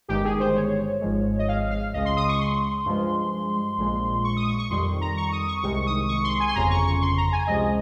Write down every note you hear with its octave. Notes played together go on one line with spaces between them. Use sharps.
G1 G2 D#3 G#3 G4
G#4
C5
C#5
G#1 G#2 F3 G#3
D#5
F5
F5
C#2 C#3 G#3 D#5
C6
D#6
C#6
C6
G2 F3 G#3
A#1 A#2 F3 G#3
C#6
D#6
C#6
C#6
F2 D#3 G3 C6
A#5
C#6
D#6
C#6
C2 C3 D#3 G#3 C#6
D#6
C#6
C6
G#5
C6
G1 F2 C#3 A#5
C#6
C#6
C6
A#5
G#5
C#2 C3 F3 G#3 D#5